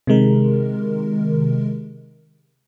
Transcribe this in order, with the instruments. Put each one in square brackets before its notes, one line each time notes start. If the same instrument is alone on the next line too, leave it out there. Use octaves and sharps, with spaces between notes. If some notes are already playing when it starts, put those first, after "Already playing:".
[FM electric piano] C3 D#3 G#3 A#4